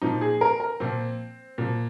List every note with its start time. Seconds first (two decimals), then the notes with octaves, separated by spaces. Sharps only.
0.02 A#2 F3 D#4
0.21 G#4
0.41 A#4
0.60 A#4
0.80 A#2 F3 C4
1.58 A#2 F3